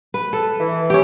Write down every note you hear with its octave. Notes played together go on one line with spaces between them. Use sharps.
B4
A4
E3
C#4 G4